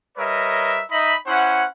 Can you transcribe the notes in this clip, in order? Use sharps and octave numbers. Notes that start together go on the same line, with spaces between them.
G3 A#4 B4 C#5 D#5 E5
D#4 D#5 E5 B5
C#4 E4 C5 F#5